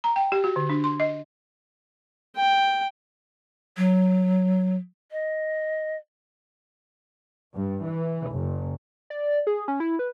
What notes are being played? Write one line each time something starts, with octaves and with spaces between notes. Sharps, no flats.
A#5
G5
G4
F#4
D3
D4
C6
D#5
G5
F#3
D#5
G2
E3
F#1
D5
G#4
C#4
E4
B4